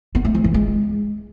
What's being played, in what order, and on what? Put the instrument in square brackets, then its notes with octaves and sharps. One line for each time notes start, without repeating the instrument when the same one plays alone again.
[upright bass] B3
A3
F3
E3
G#3